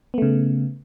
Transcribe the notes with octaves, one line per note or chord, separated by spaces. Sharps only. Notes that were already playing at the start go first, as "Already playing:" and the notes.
C#3 A3 B3